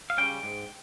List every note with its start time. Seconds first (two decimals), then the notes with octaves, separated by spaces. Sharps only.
0.10 F5
0.18 C#3 G3 C#4 G5
0.43 G#2